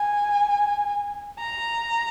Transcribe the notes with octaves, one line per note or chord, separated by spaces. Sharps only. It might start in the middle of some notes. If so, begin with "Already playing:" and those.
Already playing: G#5
A#5